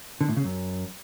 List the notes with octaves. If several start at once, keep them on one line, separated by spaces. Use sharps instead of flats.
D3
A2
C#3
F#2